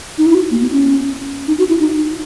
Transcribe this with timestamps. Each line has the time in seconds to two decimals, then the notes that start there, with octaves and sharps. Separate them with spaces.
0.18 D#4
0.26 E4
0.34 F#4
0.51 A#3
0.61 B3
0.72 C#4
1.48 D#4
1.59 F#4
1.69 E4
1.80 D#4
1.96 D#4